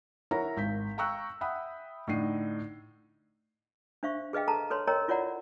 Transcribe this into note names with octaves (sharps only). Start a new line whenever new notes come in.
E4 A#4 C#5 E5 F#5 A#5
G#1 G6 B6
F5 G5 A#5 C#6 E6 F#6
E5 F#5 G5 B5 D#6
A2 D3 D4 D#4 C7 D#7
D4 C5 E5 F5 C#6
G#4 B4 D#5 F5 G5
A4 A5 A#5
A4 B4 C#5 C6
A#4 C#5 D#5 G5 A#5
E4 F4 C#5 D5 F#5 A#5